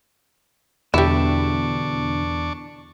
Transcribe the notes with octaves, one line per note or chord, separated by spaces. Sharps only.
E2 B2 D3 G3 D4 E4 C#6 D6